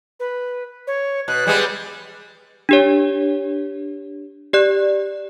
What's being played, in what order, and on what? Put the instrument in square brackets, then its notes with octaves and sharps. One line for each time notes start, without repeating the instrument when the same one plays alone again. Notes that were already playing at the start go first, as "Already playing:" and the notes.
[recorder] B4
C#5
[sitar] B2 [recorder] F#6
[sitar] G3 G#3 B3
[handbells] D4 G4 C#5
G4 D5 F#6